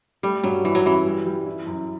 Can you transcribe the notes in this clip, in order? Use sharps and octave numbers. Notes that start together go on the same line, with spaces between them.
G3 A3
G2 F#3
E3 G3
F#3
E3 C#4
G3
G3
E4
F#2